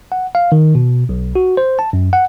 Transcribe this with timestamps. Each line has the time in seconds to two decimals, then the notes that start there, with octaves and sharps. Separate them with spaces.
0.12 F#5
0.35 F5
0.52 D#3
0.75 B2
1.09 B1
1.35 F#4
1.57 C5
1.79 A5
1.93 F#2
2.13 F#5